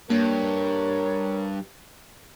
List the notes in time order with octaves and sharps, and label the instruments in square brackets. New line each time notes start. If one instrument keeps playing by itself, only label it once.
[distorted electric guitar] G2 [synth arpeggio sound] A#3 [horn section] A#4 C#5